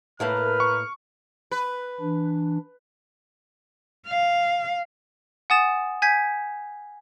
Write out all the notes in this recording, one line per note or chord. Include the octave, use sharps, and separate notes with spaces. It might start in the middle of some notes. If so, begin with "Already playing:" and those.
A2 A3 A#3 A#4 B4 F6
C#6
B4
E3 D4
F5
F#5 G#5 D#6 A6 E7
G#5 G6 G#6 B6